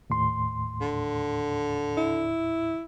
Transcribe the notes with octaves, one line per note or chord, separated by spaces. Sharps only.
D#2 A2 C6
D3
E4